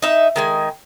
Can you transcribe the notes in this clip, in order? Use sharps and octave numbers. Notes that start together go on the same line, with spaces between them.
D#4 E5
D#3 G#3 G#5